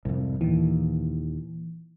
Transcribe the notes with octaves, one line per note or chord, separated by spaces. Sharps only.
C2 F2 G#2
D#2 A#2 E3